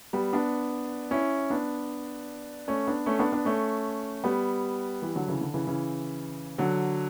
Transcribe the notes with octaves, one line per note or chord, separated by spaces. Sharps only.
G3 B3
B3 D4
C#4 E4
B3 D4
A3 C#4
B3 D4
A3 C#4
B3 D4
B3 D4
A3 C#4
G3 B3
E3 G3
D3 F#3
C#3 E3
D3
C#3 E3
C#3 E3
D3 F#3